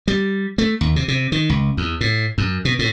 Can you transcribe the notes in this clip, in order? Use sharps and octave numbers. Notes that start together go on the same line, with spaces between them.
G3
A3
D#2
C3
C3
D#3
C#2
E2
A2
F#2
B2
A2